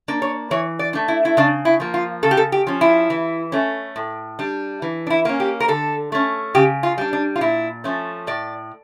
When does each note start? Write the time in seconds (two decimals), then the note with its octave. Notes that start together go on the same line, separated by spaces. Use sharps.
0.08 A#3 D4
0.22 C#5
0.51 E3 C#5
0.79 D5
0.93 A3 D4
1.08 E4
1.25 E4
1.37 C#3 D4
1.65 E4
1.80 F3 A#3
1.94 F4
2.23 C#3 A4
2.31 G4
2.37 A4
2.52 G4
2.67 F3 C#4
2.81 E4
3.10 E3
3.52 A3 C#4
3.96 A2
4.39 G3 D4
4.82 E3
5.07 D4
5.10 E4
5.25 A#3 C#4
5.40 G4
5.60 A#4
5.68 D3 A4
6.12 A3 C#4
6.55 C#3 G4
6.83 F4
6.98 G3 D4
7.13 D4
7.36 F4
7.41 A#2 E4
7.84 F3 A3 C#4
8.27 A2 D5